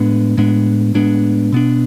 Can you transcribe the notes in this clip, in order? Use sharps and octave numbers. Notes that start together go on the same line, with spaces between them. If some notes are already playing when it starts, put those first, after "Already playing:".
Already playing: A2 G#3 B3 D4
A2 G#3 B3 D4
A2 G#3 B3 D4
B2 B3 D4